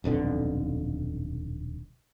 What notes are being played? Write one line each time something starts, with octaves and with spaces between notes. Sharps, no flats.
D#1 B1 F2 D3